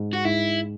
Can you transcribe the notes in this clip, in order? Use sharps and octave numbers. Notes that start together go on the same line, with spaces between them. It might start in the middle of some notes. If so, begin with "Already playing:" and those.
Already playing: G#2
F#4
G#2 E4